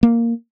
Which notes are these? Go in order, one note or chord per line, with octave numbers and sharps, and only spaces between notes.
A#3